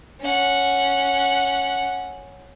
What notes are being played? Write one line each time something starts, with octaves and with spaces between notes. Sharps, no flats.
C#4 F#5